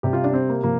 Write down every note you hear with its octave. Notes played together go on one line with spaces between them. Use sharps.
C3 G3 G4
F4
D4
C4
A#3
C3 F3 A#3